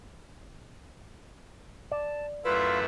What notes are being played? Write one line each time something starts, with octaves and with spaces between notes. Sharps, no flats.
D5 A5
F#2 A3 E4 F4 B4 F5